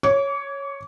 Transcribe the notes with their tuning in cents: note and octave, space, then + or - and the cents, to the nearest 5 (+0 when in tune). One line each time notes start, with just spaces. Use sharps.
C#5 +0 D6 -35